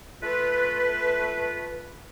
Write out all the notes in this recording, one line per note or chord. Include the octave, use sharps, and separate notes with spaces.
A3 F4 B4